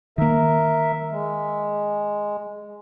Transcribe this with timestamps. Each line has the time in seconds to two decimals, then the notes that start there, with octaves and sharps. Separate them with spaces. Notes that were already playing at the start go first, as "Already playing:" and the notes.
0.18 D#3 A#3 A#4 E5
1.11 G#3